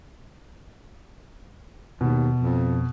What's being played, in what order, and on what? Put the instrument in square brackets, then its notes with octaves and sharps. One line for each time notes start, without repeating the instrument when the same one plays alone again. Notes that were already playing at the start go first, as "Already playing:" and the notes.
[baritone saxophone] D#2 [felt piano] B2
[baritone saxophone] F2